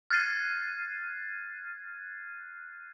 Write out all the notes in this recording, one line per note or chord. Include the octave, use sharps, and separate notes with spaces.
F6 F#6 G#6 A6 C7 D#7